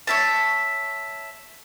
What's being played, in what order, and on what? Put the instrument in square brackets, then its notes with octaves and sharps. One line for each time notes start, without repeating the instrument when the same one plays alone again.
[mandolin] C#5 E5 A5